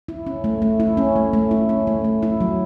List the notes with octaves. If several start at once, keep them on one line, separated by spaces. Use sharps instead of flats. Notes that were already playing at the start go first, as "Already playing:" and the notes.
E4
C#4
A3
A3
E4
C#4
A3
A3
E4
C#4
A3
A3
E4
F#3